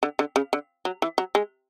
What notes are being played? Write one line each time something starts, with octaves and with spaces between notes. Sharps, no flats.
D3
D3
C#3
D3
F#3
E3
F#3
G#3